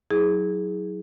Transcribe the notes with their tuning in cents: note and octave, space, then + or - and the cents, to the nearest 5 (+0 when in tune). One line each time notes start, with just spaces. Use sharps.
F#3 +0 E4 -35 G#4 +0